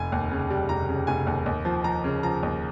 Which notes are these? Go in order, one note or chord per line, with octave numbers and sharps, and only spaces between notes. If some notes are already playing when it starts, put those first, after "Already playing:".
Already playing: F1 G#5
D#2
C#3
G3
F1 A#5
C#3
F1 G#5
D#2
D#2
F3
F3 A#5
C#3
F3 A#5
D#2